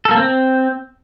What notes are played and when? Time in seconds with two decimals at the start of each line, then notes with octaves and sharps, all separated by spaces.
0.05 A4
0.11 A#3
0.17 C4